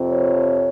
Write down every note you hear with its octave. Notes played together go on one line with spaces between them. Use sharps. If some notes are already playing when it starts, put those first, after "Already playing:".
Already playing: F2 C3 F3 C4
C#5